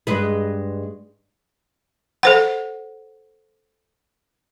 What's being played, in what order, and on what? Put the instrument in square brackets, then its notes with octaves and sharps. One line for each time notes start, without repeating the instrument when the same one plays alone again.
[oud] G2 G#3 B4
[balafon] A4 C5 F#5